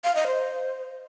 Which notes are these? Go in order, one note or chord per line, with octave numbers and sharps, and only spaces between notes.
F5
D#5
C5